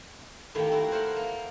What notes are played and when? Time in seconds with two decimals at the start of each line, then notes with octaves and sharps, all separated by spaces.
0.55 A2 D#3 A3 A#3 G4
0.72 E4 F#4
0.92 F#4 A4 A#4 C5 F#5
1.16 A#3